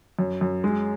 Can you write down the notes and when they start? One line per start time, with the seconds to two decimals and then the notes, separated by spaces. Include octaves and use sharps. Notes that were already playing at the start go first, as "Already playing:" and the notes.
0.19 F#2
0.41 F#2
0.64 G#3